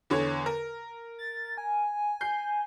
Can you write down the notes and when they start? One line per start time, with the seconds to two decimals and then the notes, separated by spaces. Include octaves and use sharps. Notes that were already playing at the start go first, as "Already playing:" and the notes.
0.10 E2 D3 C#5
0.46 A#4
1.19 A6
1.58 G#5
2.21 G6 C7